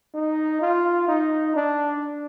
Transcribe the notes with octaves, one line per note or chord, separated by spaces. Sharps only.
D#4
F4
D#4
D4